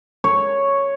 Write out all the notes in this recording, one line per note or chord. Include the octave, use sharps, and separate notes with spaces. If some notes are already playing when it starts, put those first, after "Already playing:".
C#5